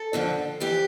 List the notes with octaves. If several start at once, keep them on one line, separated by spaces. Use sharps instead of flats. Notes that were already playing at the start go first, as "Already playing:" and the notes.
Already playing: A4
F2 D3 F3
F2 E3 G4